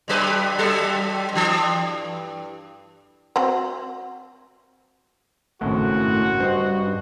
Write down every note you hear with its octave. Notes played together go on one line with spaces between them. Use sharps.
G2 F#3 B4
F#3 A4
G2 E3
C4 F#4 C5
G#1 F#2 A2 C#3 F#4
G2 C5 D#5